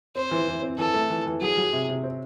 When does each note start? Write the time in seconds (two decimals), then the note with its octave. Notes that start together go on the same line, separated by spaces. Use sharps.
0.15 C4 C5
0.31 E3
0.48 E3
0.63 C4
0.78 E3 A4
0.94 A3
1.10 E3
1.26 E3
1.41 F#3 G#4
1.57 F#3
1.73 C3
1.89 C3
2.04 C4